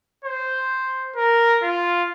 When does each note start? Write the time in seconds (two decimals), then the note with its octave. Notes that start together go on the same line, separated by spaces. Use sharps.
0.24 C5
1.16 A#4
1.62 F4